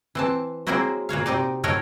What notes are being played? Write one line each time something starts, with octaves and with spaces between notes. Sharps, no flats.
E3 C4 A5
F#3 G#3 A#3 C4 E4 F#4
A#2 F#4 C#5 F5
C3 C4 D#4 D5
A2 F#3 D#4 A4 A#4 C#5